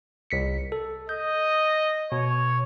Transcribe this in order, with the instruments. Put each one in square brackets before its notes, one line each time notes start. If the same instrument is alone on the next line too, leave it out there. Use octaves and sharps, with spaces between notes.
[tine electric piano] C2 B6 C#7
A4
[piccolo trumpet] D#5 [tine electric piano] G6
[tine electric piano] B2 [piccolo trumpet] C#5